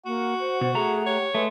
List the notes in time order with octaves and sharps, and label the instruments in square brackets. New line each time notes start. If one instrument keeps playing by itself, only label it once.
[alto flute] A#3 [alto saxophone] F#4 [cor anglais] F#5
[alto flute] C5
[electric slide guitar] B2 [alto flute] C5
[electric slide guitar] A3 A#5 [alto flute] G#4
[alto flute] G4 [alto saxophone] C#5
[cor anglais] G#3 [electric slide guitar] A3 [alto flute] B4